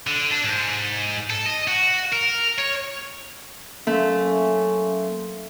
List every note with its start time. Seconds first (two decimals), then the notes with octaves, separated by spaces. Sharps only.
0.07 D3
0.32 D4
0.45 G#2
1.30 A4
1.46 D#5
1.68 F#4
2.12 A#4
2.59 C#5
3.87 F#3 A3 A#3 C#4 E5 C6